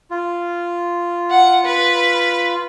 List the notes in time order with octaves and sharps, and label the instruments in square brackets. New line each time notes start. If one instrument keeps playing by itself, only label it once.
[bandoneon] F4
[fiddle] F#5
B4